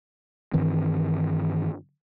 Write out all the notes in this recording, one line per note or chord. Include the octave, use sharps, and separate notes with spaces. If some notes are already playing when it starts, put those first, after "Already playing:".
G2 D#3 E3 C4